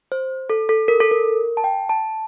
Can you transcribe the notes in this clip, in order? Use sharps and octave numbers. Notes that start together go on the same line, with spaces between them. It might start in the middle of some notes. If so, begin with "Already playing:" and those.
C5
A4
A4
A#4
A4
A#4
A5
G5
A5